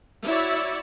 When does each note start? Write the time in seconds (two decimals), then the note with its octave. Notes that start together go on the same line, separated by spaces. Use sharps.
0.24 E4 F#4 C#5 D5 E5